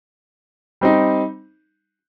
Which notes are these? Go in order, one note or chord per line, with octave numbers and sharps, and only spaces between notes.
G3 C4 D#4